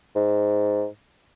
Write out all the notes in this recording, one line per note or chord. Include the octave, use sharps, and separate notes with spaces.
G#2